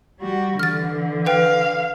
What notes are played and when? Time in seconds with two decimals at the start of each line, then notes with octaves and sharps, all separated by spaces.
0.20 G3 F#4
0.59 D3 E3 F6 A6
1.26 B4 F5 G5